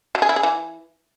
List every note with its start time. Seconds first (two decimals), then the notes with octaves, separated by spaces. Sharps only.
0.15 F#3
0.22 G#4
0.29 E4
0.36 G#4
0.43 E3